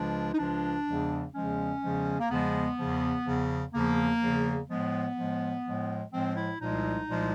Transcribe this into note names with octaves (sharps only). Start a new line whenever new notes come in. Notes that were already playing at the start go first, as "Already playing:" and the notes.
Already playing: C#2 C#3 F3 G#3 D4
D#4
C#2 C#3 F3 G#3 D4
E2 C#3 F3 G#3
E2 C#3 F3 G#3 C#4
E2 C#3 F3 G#3
A#3
E2 C#3 F3 G#3 B3
E2 C#3 F3
E2 C#3 F3
E2 C#3 F3 A#3
E2 C#3 F3
A2 F3 G#3 B3
A2 F3 G#3
A2 F3 G#3
A2 F3 G#3 C4
E4
C2 A#2 F3 G#3 D#4
C2 A#2 F3 G#3